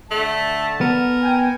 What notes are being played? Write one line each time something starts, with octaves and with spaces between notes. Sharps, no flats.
D3 A3 A4 A5
B3 A#4
G5 G#5